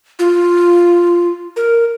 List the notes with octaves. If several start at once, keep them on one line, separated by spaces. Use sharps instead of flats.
F4
A#4